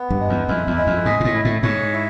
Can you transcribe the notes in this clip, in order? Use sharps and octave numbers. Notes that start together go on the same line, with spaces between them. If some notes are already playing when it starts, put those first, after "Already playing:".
Already playing: B3
G2
G#3
E2
F2 E4
E2
G#3
F2
G#2 G#4
A#2
A2
E4
A2
G#2 C#5
E4